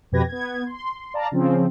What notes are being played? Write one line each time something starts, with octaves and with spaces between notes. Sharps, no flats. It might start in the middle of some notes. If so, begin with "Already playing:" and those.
F2 B2 G4 B4 G#6 A#6
B3 G#6
C6
D5 F5 A5 A#5
C#3 F3 C4